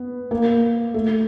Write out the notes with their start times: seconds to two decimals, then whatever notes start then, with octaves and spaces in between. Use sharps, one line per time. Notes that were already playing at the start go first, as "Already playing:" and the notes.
Already playing: B3
0.31 A#3
0.94 A3